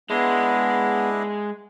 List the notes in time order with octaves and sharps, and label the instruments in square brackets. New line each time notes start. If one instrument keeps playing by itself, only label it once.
[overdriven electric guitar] G#3 [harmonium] B3 [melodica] D4 E4 D#5